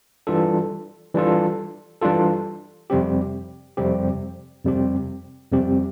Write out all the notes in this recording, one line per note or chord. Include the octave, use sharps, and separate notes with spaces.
E3 G3 D4 F4 A4
E3 G3 D4 F4 A4
E3 G3 D4 F4 A4
F2 C3 G3 C4 G4
F2 C3 G3 C4 G4
F2 C3 G3 C4 G4
F2 C3 G3 C4 G4